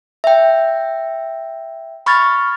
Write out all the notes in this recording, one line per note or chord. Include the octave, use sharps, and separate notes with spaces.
E5 G5
B5 C#6 F6 G#6 A6